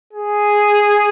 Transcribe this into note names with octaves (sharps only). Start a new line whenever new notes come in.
G#4